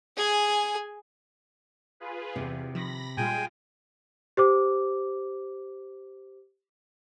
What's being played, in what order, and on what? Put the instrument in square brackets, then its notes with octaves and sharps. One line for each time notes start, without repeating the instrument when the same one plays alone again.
[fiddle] G#4 G#5
[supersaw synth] F4 G#4 B4
[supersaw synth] E2 [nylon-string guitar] C3
[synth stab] D#3 F3 [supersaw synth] B5 A#6
[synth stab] A#2 G3 [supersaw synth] G#3 F4 [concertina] G5 G#5
[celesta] G4 C5 D6